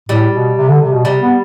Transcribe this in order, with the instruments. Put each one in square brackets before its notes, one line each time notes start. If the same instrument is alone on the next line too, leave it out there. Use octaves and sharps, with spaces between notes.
[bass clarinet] A2 [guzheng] G3
[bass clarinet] B2
C3
D3
C3
B2
[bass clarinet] C3 [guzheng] G3
[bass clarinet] B3